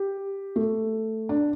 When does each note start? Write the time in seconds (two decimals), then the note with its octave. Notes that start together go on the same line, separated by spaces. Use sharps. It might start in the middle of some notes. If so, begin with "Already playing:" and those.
Already playing: G4
0.56 A3
1.29 D4